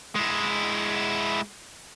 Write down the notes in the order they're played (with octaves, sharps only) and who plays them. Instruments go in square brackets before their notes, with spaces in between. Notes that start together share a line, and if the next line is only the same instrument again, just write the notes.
[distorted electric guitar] G#3 E4